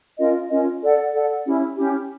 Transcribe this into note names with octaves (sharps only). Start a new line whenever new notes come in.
C#4 F4 A#4 D#5
C#4 F4 A#4 D#5
A4 D5 F#5
A4 D5 F#5
C#4 E4 G4
C#4 E4 G4